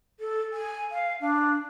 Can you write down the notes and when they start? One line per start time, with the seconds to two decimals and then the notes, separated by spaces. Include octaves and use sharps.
0.20 A4
0.53 G#5
0.91 F5
1.21 D4